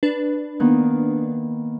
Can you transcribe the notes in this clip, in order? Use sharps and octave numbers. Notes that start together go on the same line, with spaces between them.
D4 B4
D#3 A#3 B3